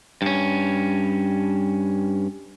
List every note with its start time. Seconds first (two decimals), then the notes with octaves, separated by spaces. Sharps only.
0.22 G2 C#4